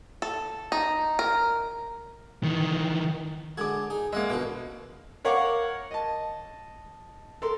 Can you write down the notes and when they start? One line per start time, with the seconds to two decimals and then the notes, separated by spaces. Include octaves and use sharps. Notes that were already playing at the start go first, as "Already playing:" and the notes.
0.22 A4
0.72 D#4
1.19 A#4
2.43 D#3 E3
3.57 D3 G#3 F#4 D6 G#6
3.90 D#4 G#4
4.13 G#3 A#3 E5 F#5
4.30 B2 D3 F4 B4
5.25 A#4 C#5 F5 F#5 C#6 D6
5.91 D#5 A5
7.42 A4 A#4 C6